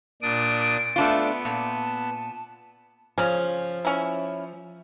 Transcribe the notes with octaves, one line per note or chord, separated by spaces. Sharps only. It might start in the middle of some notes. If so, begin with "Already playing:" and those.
A#2 D4 D#6 D7
A3 B3 D4 F4
A#2 A5
C#3 F3 C#4
C#4 E4